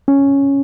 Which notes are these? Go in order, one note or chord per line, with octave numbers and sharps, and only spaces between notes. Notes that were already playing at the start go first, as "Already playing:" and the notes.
C#4